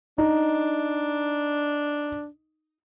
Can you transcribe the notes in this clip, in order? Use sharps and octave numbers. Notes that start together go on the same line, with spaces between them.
D4 D#4